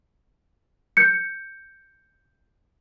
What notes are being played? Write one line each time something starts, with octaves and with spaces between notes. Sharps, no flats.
G6 C#7